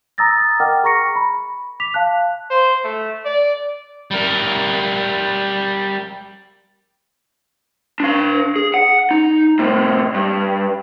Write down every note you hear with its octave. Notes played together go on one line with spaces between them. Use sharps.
A#5 D#6 E6 A6 A#6
A#4 D#5 F#5 G5 D6 F6
G#4 A#5 C#6 A#6 C#7
B5
D6 B6 F7
F5 A5 F#6
C5
A3
D5
G3 A#4
D4 F5
G#4
F#5
D#4
A2 C3
G2